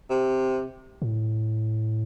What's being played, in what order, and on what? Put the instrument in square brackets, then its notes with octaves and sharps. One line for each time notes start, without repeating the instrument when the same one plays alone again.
[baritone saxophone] C3
[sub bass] A2